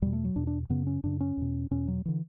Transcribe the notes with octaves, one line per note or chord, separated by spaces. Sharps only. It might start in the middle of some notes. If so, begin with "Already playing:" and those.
E2 B2 G3
A3
F#3
E2 B2 D4
D4
F#2 C#3 B3
C#4
F#2 C#3 D4
C#4
E2 B2
E2 B2 C#4
F#3
D3 E3